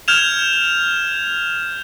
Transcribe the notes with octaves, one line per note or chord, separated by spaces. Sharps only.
F6 G6 G#6 E7 F7